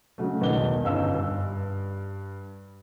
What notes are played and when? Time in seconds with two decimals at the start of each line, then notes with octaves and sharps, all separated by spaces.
0.18 C#3 F#3 G#3 A3
0.41 B1 E2 D#3 D#4 G7
0.84 G1 C#4 D#4 F5 E6
1.14 G2